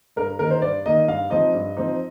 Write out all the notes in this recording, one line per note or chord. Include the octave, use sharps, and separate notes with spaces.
G2 A#4
D#3 A#3 D#4 A#4
C5
G2 D5
D#3 A#3 D#4 D#5
G2 F5
F3 C4 D#4 D#5
G2
F3 C4 D#4